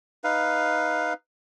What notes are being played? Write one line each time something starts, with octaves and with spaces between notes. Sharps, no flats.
D#4 B4 F5